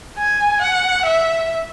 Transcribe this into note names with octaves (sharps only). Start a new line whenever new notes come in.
G#5
F#5
E5